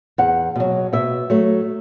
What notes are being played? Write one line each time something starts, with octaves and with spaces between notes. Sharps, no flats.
E2 F#5
B2 F#3
B2 E5
F#3 A3